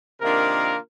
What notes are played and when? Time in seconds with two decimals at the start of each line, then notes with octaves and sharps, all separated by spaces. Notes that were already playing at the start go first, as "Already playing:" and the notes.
0.21 C3 D#3 A#3 D4 F4 A#4